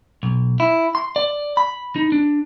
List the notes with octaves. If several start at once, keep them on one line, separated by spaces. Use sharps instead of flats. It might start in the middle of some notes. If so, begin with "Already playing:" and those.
B1
E4
C6
D5
B5
D#4
D4